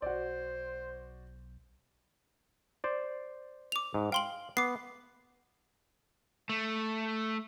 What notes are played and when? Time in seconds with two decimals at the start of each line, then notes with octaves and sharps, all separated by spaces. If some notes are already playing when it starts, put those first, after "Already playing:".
0.02 B1 F#4 C5 D5
2.84 C5 D5
3.72 D6 F7
3.94 G#2
4.12 F5 G5 C6 F#7
4.57 B3 D6 C7
6.49 A3